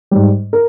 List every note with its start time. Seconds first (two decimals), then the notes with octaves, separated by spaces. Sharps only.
0.11 G#2 G3
0.53 A#4